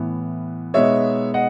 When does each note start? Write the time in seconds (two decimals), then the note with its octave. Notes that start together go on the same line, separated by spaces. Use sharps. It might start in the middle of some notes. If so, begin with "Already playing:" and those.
Already playing: A2 E3 B3
0.74 B2 G#3 B3 D#4 C#5 E5
1.34 D#5 F#5